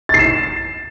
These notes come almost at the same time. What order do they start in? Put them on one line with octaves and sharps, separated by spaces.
A6 C7 E7